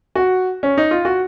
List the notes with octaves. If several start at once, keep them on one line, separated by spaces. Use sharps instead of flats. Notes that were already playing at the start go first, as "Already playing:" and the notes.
F#4
C#4
D#4
F4
F#4